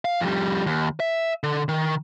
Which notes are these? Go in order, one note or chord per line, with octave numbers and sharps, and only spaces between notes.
F5
F2 G3
D#2
E5
D3
D#3